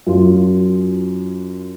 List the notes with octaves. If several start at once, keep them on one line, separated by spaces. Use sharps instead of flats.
F#2 F4